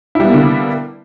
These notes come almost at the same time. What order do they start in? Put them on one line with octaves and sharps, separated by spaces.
E4 G3 B3 A#3 D3